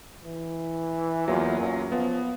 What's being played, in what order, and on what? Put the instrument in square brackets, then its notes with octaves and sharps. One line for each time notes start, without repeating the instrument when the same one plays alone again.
[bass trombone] E3
[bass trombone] E2 [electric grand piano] F#3 A#3 F4
[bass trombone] F#2
[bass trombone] F3 [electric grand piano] B3